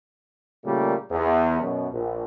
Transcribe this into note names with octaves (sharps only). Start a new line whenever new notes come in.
A#2 C#3 G3 A3 A#3
E2
F#2 B2
A#1